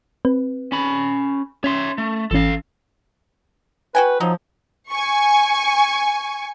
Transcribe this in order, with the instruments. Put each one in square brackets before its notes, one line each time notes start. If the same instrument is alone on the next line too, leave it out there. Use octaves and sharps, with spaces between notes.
[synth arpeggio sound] C4 B4
[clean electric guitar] C#4 B5
[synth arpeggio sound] C#4 [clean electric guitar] C#5 E5 C6
[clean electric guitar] A3
[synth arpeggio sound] G#1 E3 C#4 [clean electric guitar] A4 F5
[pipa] F#4 G5 G#5 [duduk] B4
[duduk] F3 [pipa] F#3 D#4
[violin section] G#5 C#6